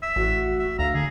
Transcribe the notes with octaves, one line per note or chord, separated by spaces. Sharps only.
E5
A1 F#4
E5
D2 F5 A#5
D3 G#4